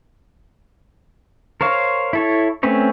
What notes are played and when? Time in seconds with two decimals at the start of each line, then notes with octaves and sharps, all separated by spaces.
1.61 A#4 C5 C#5 F5
2.13 E4 A4 C#5
2.63 A3 C4 C#4 B4 C#5